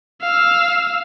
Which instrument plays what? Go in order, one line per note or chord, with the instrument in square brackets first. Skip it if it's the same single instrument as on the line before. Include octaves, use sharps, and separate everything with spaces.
[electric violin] F5 E6